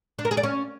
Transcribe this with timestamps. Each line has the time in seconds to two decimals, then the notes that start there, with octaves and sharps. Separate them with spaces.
0.19 D4
0.25 A#4
0.31 G#4
0.37 D5
0.43 C#4